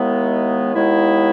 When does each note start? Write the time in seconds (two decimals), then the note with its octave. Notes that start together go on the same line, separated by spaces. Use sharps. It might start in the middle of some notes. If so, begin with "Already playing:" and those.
Already playing: D#2 D#3 G#3 B3 E4
0.75 D#2 D#3 G#3 B3 E4